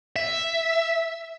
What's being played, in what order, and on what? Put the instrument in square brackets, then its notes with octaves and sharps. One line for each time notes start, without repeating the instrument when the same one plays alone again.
[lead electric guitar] E5